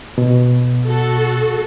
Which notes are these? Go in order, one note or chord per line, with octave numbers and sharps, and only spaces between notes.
B2
F#4 A4